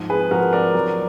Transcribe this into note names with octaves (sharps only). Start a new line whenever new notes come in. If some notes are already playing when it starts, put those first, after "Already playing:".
Already playing: G#2 F3
G#4 B4
F3 F#4 A#4
A#4 D5
F#3